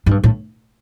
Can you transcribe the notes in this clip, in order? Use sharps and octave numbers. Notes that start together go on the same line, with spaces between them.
G#2
G2
A2